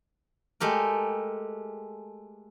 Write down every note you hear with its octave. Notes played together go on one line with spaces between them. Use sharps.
G#3 A3 G4 A#4